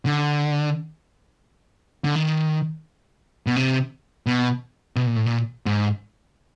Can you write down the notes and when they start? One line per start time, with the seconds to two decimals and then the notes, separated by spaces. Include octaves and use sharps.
0.06 D3
2.05 D3
2.16 D#3
3.47 B2
3.56 C3
4.27 B2
4.96 B2
5.06 A#2
5.16 A2
5.26 A#2
5.66 G#2